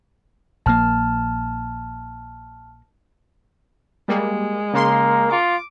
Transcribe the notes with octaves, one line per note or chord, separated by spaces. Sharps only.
A#1 A#3 A5 F6
G3 G#3 A#3
C#3 A#3 A#4 C6
F4 D6